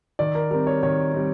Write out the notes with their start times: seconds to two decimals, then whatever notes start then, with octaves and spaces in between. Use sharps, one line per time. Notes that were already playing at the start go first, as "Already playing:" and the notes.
0.19 D#3 D5
0.35 A#4
0.51 G3 C4 A#4
0.67 C#5
0.83 D#3 C#5
1.14 G3 C4